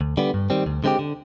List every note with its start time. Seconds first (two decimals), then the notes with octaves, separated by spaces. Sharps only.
0.01 D2
0.17 D3 G3 B3
0.34 G2
0.50 D#3 G3 C4
0.66 D2
0.84 D3 G#3 C4 G4
0.99 D3